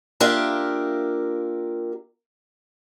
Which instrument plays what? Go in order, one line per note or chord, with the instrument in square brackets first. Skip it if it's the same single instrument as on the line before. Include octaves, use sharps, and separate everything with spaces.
[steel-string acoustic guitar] A#3 D4 F4 G4 A#4 E5